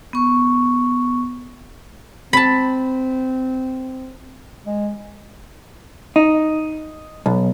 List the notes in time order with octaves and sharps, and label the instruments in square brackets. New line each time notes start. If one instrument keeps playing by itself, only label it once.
[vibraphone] B3 C#6
[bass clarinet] C4 [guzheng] A5 B5
[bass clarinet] G#3
[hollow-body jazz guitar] D#4
B1